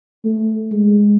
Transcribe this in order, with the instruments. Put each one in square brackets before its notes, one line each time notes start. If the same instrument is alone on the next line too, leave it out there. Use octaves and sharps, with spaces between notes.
[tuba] A3
G#3